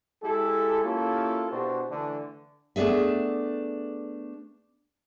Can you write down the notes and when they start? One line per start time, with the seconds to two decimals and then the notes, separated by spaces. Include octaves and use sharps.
0.22 G#3 E4 G4 A4
0.83 A#3 C#4 E4 F4 G4 A4
1.51 B2 D4 E4 F#4 G4 C5
1.90 D3 E3 A3 D4
2.76 A3 B3 D4 G#4 E5